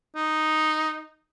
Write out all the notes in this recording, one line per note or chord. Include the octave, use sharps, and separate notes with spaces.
D#4